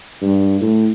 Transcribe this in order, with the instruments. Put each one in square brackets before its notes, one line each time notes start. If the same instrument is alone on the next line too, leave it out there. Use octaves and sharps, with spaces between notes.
[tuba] G2
A2